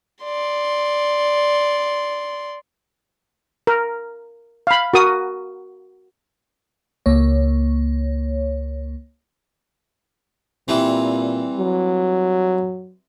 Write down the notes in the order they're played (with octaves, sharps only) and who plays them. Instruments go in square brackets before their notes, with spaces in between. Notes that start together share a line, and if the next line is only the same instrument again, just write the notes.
[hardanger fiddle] D5 C6
[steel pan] A#4
F5 B5
F#4 A#4 D#6
[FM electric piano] C#2 A#3 C#5
[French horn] A#2 [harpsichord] E3 G3 C4
[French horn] F#3